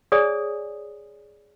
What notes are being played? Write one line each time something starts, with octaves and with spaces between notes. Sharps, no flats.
G#4 C#5 D5 G#5 D#6